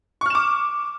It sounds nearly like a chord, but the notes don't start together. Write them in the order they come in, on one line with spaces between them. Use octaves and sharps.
C#6 F6 E7 D6